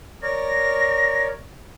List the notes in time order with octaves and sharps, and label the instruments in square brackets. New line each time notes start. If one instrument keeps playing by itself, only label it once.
[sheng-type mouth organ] A#4 C#5 D5 [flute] A#6